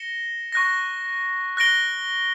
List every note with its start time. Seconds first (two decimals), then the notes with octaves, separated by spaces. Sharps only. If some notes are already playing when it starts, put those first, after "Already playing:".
Already playing: A#6 C#7 E7 G7
0.52 C#6 F#6 A#6
1.57 F#6 A#6 D7 G7